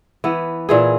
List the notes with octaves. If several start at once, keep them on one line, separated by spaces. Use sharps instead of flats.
E3 B3
A#2 E3 G#4